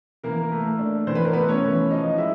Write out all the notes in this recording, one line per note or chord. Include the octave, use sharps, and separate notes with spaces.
E3 A#3 A#4
A3
D4
E3 C5
B4
A#4
A3 B3 B4
C#4 C#5
E3
F3 D#4 D#5
G#3 E4 E5